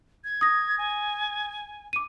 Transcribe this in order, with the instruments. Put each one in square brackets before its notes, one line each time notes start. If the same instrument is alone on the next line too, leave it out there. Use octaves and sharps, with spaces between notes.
[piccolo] G#6
[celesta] D#6 A#6
[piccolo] G#5
[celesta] D6 D#7